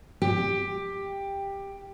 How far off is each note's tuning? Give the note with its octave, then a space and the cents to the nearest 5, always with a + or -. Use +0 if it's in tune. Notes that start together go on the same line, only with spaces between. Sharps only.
G4 +10